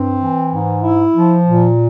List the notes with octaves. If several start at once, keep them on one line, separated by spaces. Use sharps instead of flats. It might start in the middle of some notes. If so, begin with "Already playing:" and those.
Already playing: G2 C4
E3
G#2
E4
F3
A#2